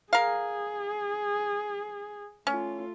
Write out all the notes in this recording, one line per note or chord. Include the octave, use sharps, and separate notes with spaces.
G#4 A#4 F5
A3 C#4 F4